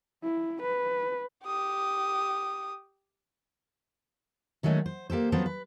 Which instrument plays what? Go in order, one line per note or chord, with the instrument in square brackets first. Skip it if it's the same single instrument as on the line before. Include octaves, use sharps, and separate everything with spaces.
[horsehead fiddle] E4
B4
[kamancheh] G4 D#6
[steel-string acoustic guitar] D#3 F#3 G#3 A3 C#4
C5
A#3 G4 A4 C5
F3 F#3 B3 C4 A4 C5
B4